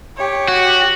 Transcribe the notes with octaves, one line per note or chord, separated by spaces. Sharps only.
G4 C#5
F#4